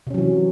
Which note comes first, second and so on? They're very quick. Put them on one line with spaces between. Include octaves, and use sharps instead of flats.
C3 C#4 F#3 E3